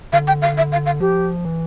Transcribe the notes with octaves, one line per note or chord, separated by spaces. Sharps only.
D3 F5
G5
F5
E5
F5
F5
F3 G4
E3